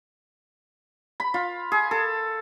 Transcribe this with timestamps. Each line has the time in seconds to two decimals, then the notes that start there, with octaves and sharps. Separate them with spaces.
1.20 B5
1.34 F4
1.72 G#4
1.91 A4